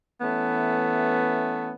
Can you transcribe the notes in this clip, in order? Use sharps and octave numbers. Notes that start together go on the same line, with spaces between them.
E3 A3 B3 C#4